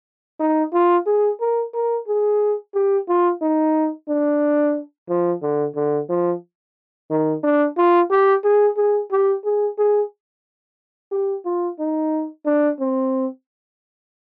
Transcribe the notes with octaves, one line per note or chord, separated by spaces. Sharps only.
D#4
F4
G#4
A#4
A#4
G#4
G4
F4
D#4
D4
F3
D3
D3
F3
D#3
D4
F4
G4
G#4
G#4
G4
G#4
G#4
G4
F4
D#4
D4
C4